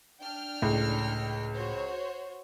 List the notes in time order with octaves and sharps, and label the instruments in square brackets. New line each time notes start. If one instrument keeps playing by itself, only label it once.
[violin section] D4 G5 F6
[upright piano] C#2 [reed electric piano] A2
[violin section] F#4 C5 C#5